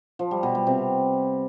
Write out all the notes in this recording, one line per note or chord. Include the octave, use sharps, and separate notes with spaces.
F3
G3
B2
G3
C3